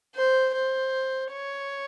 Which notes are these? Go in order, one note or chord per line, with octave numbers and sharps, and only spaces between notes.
C5
C5
C#5